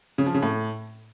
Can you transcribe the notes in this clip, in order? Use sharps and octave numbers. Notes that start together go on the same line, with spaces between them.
C#3
F3
C#3
A2